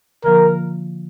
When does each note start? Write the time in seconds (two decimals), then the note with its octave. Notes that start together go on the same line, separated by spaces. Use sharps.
0.24 D3 F3 A#3 F4 A#4